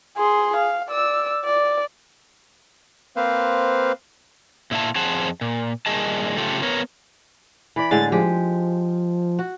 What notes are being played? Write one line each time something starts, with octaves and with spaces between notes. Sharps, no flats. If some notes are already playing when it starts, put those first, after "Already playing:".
G#4 C6
F5
D5 E6
D5
A#3 C4 B4 C5 F5
A#2 E4 F4 A5
F2 G#4 C5 F#5 A5
A#2
A#2 D#3 G3 G#4 D#5 A5
C#3 A3 F4 G4 A4
B3 A#4 C#5
E3 D5 B5
A2 D3 G#3 A6
F3 G#3 G4
F#4